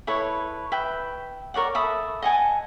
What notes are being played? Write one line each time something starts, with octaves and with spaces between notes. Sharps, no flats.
E4 A4 B4 C#5
B4 E5 G5
A#4 C#5 D5 F#5
A4 E5 B5 D#6
D#5 F#5 G#5 A5